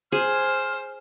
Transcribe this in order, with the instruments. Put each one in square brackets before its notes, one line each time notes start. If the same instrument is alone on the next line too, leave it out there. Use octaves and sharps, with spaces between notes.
[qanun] G#4 [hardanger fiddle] C5 [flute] F6